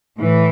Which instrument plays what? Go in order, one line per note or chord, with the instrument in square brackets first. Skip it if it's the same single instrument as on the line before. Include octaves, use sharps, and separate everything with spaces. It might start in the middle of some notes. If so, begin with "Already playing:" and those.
[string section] A2 E3